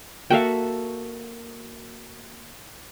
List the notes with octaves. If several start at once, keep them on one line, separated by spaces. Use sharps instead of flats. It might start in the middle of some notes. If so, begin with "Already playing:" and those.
A#3 F#4 A4 E5 F5 G5